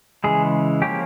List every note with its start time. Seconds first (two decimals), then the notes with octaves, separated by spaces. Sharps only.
0.24 C#3 E3 G#3 G#4
0.82 F3 A#3 C#4 G4